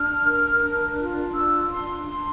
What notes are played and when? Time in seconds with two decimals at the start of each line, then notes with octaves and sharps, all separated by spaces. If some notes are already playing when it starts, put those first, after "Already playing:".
Already playing: D4 F6
0.25 A#4
0.61 D4
0.98 F4
1.35 D4 E6
1.72 D4 C6
2.09 D4 C6